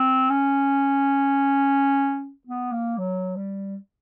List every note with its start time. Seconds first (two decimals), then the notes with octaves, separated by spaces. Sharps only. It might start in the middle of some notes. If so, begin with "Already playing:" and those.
Already playing: C4
0.30 C#4
2.47 B3
2.71 A#3
2.98 F#3
3.36 G3